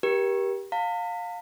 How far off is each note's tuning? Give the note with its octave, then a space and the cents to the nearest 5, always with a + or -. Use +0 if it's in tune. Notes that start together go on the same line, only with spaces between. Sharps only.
G4 +0 A#4 +35
F5 +20 A#5 -45